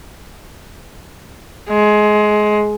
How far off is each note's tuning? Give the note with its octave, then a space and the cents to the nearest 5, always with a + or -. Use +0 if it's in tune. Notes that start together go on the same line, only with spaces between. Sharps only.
G#3 +20